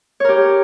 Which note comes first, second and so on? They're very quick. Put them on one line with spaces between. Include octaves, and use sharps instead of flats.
C#5 A#4 G4